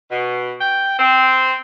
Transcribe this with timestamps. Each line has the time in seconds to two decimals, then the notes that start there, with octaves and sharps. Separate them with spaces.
0.11 B2
0.61 G5
0.99 C4